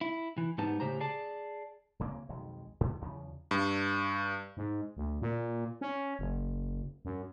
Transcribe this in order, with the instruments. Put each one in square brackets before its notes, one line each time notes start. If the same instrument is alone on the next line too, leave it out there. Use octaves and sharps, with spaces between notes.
[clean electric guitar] E4
E3
G#2 G3 B3 D#4 A5
A2 C#3 G4 C5 A#5
G#4 D5 A5
[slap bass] D1 C#3 A#3 C4
B1 F2 D#3 G#3
G2 D3 D#3
E2 C#3 F3 F#3
[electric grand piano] G2
[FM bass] G#2
D2
A#2
C#4
F#1
F#2